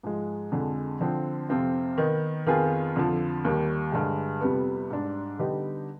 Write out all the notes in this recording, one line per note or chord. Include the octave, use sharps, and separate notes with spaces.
G#2 F3 G#3
F2 D3 G#3
D3 F3 C4
F2 C3 F3 C4 F4
D#3 B3 D#4
F2 D#3 B3 F4 G#4
F2 D3 F3
D#2 D#3 G3
G2 D3 G#3
F2 C3 G3 B3
G#2 G3 D4
D3 G3 B3 D#4 G4